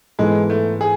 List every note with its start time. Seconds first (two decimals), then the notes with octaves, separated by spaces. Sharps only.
0.19 G#2 E3 G#3 B3 E4 A4
0.50 A3
0.81 G#4